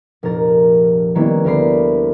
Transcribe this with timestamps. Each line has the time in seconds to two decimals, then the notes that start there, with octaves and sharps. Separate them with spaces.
0.23 F1 A#2 A#4 A6
1.15 D#3 G3 A#3 B3 C#4 E4
1.45 D2 A#3 A#4 D5 B5 C7